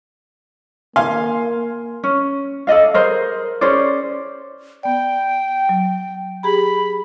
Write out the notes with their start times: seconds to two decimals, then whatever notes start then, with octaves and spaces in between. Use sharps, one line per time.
0.96 A#3 F5 G#5 C6
2.04 C#4
2.67 A4 D5 D#5 F5
2.94 G#4 A#4 C5
3.61 C#4 G#4 C5 D5
4.83 B3 D5 G5
5.69 F#3
6.43 G4 G#4 A#5 B5